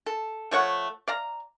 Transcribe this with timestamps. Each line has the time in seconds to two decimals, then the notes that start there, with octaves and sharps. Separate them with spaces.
0.06 A4
0.51 F3 A3 C#5 F#5
1.08 D5 F5 A#5